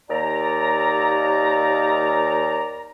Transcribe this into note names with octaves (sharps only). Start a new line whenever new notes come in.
D#2 D5 A#5